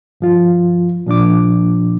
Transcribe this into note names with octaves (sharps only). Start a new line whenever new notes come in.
G2 F3 F4
A#2 F3 D4 D6